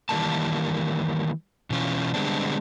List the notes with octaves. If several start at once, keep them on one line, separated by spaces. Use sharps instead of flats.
D#3 E3 G3 A#3 A5
B2 E3 C#4 F4
D3 G3 G#3 B3 C4 D4